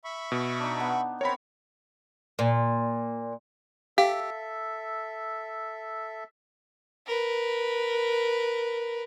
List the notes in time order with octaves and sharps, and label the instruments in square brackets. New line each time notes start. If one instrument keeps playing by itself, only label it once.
[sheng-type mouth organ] E5 B5 C#6
[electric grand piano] B2
[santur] D4 D#4
B3
[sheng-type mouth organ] C4 A#4 [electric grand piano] C#5 B5
[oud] A#2
[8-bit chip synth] G4 [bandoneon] A4 E5 [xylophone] F5
[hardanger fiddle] A#4 B4